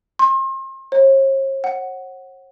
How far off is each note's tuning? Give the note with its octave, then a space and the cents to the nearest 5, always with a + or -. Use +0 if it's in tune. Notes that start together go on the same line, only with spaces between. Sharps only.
C6 +35
C#5 -45
F#5 +5